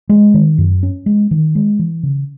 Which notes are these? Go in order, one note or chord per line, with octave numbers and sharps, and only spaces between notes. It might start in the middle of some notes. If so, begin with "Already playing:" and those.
G#3
D#3
F#2
C#4
G#3
D#3
G#3
E3
C#3